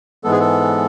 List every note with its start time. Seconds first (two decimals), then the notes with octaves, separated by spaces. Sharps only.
0.24 G#2 E3 G#3 B3 A4
0.32 G#4
0.40 A4